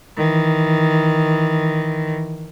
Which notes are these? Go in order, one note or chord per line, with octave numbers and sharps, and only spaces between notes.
D#3 E3